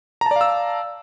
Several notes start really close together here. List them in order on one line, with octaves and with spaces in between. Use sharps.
A#5 A5 D5 F5 E6